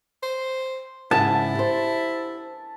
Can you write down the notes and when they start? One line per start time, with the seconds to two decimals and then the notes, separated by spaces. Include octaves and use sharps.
0.23 C5
1.11 G#2 C#3 E4 A5
1.55 G4 C5